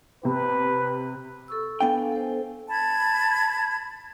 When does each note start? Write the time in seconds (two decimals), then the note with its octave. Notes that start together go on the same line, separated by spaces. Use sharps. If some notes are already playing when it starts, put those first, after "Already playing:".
0.23 C3 G4 B4
1.48 A4 C#6 E6
1.80 B3 D4 A4 F5 G5 G#5
2.12 A4 C5
2.69 A5 B5 G#6